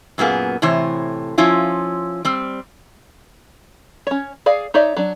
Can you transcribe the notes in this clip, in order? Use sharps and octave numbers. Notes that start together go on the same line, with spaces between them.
F#2 A#2 A#3 B3 G#4
A2 C3 E3 C5 C#5
F3 C#4 E4 F4
G3 C4
C#4 C#5
G#4 D5 F5
D#4 C#5 D5 E5
F#3 D4